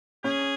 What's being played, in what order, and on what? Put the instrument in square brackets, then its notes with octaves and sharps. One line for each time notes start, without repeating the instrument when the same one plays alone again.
[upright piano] C#4 [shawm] G#4